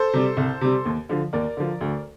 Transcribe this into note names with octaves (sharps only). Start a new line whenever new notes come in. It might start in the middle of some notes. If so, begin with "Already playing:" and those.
Already playing: A4 C5
C3 G3
C2
C3 G3
D#2
D3 F3
D#2 A#4 D5
D3 F3
D2